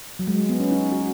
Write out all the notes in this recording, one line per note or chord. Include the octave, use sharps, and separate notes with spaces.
F#3
G#3
B3
C#4
D#4
F#4